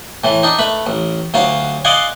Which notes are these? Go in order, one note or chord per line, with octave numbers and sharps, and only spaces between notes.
A2 E3
D4 D#4
A3 B4 B5
A1
D2 F#3 F4 F5
D5 D#5 F5 F#5 G#5 C6